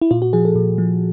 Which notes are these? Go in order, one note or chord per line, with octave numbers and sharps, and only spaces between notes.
E4
A#2 F4
F#4
F3 G#4
A4
A#2
F3